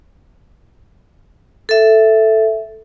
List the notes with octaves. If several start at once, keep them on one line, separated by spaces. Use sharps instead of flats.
A4 E5